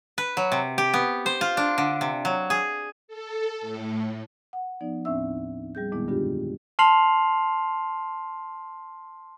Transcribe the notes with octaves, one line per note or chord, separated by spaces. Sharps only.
B4
F#3
C3
G4
B3
C5
F4
D4
D3
C3
F#3
G#4
A4
A2
F#5
F3 B3 D#4 D5
D#2 A2 C4 D4 E5 E6
G3 G#4 G6
F2 A#2 D#3 G#3 B3 E4
G2 D3 D4 F4 G4
A5 C6 F6 C7 F7 F#7